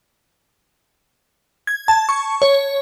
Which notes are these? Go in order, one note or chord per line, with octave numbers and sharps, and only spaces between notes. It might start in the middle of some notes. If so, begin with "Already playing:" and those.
G#6
A5
C#6
C#5